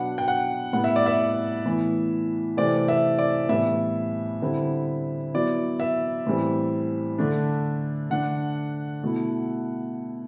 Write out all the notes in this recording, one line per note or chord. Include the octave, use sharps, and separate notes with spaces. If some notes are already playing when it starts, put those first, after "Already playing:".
Already playing: B2 F#3 B3 D4 F#5
G5
F#5
A2 G3 B3 F#5
E5
D5
E5
A2 E3 B3
C3 E3 A3 C4 D5
E5
D5
A2 E3 G3 B3 E5
D3 G3 C4 E4
F#3 B3 E4 D5
E5
A2 E3 G3 C4
D3 A3 D4
D3 A3 D4 F#5
B2 A3 E4